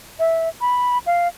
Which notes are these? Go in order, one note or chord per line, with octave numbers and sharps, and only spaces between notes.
E5
B5
F5